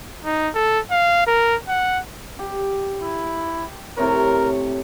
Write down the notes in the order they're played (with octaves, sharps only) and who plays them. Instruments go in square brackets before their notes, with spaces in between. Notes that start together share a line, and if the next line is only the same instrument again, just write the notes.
[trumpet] D#4
A4
F5
A#4
F#5
[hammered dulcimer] G4
[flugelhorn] E4
[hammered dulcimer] A2 C3 C#5 [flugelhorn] A#4